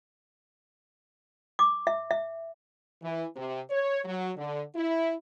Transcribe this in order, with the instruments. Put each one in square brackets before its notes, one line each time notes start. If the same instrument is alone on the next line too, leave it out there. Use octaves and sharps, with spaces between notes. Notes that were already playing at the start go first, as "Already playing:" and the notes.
[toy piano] D6
E5
E5
[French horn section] E3
C3
C#5
F#3
D3
E4